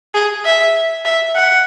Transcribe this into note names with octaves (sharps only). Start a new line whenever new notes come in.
G#4
E5
E5
F#5